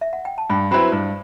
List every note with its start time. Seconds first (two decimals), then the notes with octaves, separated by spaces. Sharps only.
0.01 E5
0.13 F#5
0.25 G5
0.38 A5
0.50 G2 G5 B5
0.71 F#3 C4 E4 B4 G5 B5
0.92 G2 C5